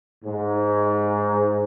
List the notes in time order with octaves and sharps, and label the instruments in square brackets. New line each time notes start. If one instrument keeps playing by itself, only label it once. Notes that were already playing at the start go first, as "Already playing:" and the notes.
[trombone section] G#2